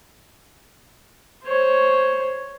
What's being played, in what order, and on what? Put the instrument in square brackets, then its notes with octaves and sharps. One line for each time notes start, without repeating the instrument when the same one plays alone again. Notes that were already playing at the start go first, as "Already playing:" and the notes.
[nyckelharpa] C5 C#5